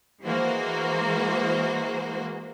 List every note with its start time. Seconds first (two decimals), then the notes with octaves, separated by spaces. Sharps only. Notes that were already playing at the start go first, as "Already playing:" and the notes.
0.25 E3 G#3 A#3 F#4 C5